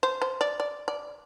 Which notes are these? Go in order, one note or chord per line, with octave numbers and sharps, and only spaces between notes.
C5
C5
D5
D5
D5